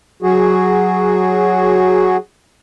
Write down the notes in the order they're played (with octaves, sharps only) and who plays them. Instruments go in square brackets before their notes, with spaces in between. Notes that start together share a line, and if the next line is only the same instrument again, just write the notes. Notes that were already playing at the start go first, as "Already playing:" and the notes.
[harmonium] F#3 F#4 G#4